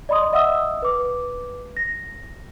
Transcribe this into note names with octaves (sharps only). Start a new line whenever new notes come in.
D5 D#5 B5 C6 D#6
D#5 E5 F#5 D#6 E6
B4 D6
A#6